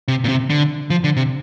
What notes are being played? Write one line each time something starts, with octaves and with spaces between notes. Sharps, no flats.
C3
A#2
C3
D3
F3
D3
C3